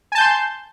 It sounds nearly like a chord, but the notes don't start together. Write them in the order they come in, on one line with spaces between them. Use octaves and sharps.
G#5 A5 G6 C6